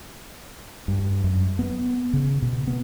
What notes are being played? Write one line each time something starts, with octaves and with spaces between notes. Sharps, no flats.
G2
F#2
B3
C#3
B2
B3